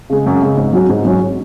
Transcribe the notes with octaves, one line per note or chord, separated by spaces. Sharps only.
C#3 G#3
F#2
C#3 G#3
G#2
F#3 C#4 F#4
G#2
F#3 C#4 F#4